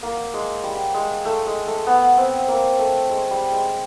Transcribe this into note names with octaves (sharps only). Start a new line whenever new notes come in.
A#3
G#3
G3
G#3
A3
G#3
A3
B3
C4
A#3
A3
G#3
G3
G#3